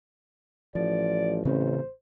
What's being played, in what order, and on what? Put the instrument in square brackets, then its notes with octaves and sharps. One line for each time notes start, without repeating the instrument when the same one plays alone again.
[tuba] A1 [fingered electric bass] F3 [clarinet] D5
[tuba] A1 [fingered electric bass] C#3 C4 C#4 [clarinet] C5